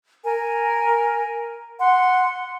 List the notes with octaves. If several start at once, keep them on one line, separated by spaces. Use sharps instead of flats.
A#4 G#5
F#5 C6